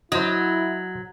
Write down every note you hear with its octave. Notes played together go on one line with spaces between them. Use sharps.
F#3 E4 C5 D#5